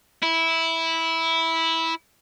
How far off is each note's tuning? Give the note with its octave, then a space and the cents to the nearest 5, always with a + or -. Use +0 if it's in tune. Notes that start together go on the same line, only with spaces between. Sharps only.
E4 -10